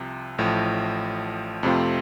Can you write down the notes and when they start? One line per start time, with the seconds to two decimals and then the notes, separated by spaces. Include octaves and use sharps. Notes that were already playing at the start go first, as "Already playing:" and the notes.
Already playing: C2 C3 F3
0.38 A1 A2 F3
1.63 F2 C3 A3 C4 F4